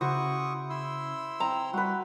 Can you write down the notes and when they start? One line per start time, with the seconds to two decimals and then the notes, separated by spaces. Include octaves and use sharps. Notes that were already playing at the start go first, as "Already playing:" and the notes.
0.01 C#3 E4 F#4 C5 C#6 D#6
0.70 E4 C6 E6
1.40 C4 A#5
1.73 G3 F#4 B4 C6